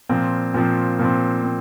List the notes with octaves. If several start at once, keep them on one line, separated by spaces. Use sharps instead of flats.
A#2 F3 C4
A#2 F3 C4
A#2 F3 C4
C4